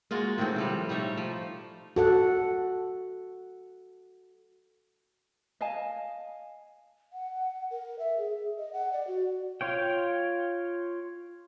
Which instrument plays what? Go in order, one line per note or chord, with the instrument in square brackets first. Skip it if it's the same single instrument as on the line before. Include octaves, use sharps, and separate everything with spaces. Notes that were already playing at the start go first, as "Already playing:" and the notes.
[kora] G#3 A#3 F4 F#4
A2 D#3 G#3 C4
A2 F3 G3
G3 A3 D#4 C#5
F3
[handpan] F#4 A4 F#5
[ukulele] D#5 F5 G#5 A5
[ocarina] F#5
A#4
E5
G#4
D#5
F#5
D5
F#4
[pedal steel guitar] F4 C#5 G5